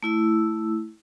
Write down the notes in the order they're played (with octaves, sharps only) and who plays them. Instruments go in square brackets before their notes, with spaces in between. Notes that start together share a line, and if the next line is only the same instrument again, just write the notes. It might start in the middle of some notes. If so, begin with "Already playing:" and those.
[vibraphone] A3 E4 E6